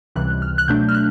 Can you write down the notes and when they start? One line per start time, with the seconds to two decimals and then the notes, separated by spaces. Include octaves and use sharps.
0.16 C#2 C3 E3 G3 F#6
0.42 F6
0.58 F#6
0.68 B2 F#3 A3 D4 G6
0.88 F6
0.94 F#6